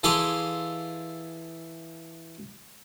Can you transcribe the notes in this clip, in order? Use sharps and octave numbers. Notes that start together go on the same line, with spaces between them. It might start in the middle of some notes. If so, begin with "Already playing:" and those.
E3 G#4 A4 F5 C6 D6